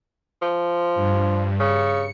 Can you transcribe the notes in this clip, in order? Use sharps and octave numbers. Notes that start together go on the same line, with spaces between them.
F3
G2
C#3 C#7